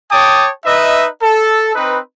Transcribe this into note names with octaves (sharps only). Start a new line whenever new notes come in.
C#5 G5 A5 D6 D#6
D#4 B4 D#5 E5
A4
C4 D#4 B4